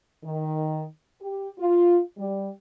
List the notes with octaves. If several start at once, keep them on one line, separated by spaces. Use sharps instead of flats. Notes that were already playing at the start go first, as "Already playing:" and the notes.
D#3
G4
F4
G3